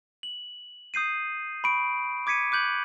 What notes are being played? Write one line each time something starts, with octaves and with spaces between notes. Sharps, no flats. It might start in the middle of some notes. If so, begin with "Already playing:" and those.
F#7
D#6 G6 C7 D#7
B5 C#6 D7
D6 G#6 B6 C#7 D#7
D6 F#6 G6 F#7